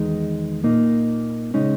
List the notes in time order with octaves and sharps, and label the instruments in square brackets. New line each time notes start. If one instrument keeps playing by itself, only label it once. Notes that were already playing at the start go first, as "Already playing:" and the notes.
Already playing: [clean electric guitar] E2 D#3 G#3 D#4
A#2 A#3 D#4
C#3 G#3 C#4 D#4